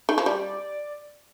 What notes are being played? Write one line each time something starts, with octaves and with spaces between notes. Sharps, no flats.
D#3
F3
G3 D5